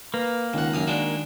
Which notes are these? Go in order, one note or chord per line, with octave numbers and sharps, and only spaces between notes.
A#3 B4
C#2 D#3 F#5
F#2 F5 D#6
G#3 D4 F#4